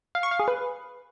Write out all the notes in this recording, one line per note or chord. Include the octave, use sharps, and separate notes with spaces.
F5
C#6
F5
G#4
B4